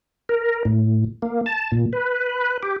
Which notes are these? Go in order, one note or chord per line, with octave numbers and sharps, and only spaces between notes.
A#4
A2
A#3
A5
A#2
B4
G4